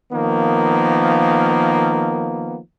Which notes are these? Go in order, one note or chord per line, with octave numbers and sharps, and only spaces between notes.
D#3 F3 A#3 B3